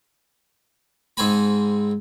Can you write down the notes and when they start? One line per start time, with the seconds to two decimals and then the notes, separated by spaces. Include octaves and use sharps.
1.17 G#2 C4 G#5 B5